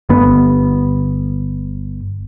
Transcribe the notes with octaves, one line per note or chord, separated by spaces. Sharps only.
G1 B3